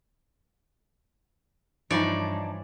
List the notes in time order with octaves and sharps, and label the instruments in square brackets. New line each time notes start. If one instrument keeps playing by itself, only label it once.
[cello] G2 [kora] E3 F3 F5 [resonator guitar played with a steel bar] D4 D#4 [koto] C#5 D5